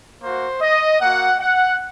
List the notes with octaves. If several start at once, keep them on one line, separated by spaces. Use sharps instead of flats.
A#3 F#4 C5
D#5
A#3 F#4 F#5
F#5